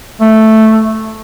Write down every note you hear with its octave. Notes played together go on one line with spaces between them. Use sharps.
A3